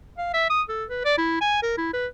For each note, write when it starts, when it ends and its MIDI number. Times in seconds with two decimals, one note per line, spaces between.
0.18 0.29 77
0.34 0.47 76
0.50 0.62 87
0.69 0.84 69
0.89 1.04 71
1.05 1.13 74
1.18 1.37 64
1.41 1.59 80
1.63 1.77 70
1.77 1.92 64
1.93 2.07 71